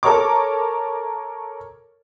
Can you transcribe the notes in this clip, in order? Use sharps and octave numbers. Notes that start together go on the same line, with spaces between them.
A4 A#4 C#5 A#5 C#6 D6